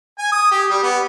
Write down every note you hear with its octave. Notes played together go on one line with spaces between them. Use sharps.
G#5
D#6
G4
G3
B3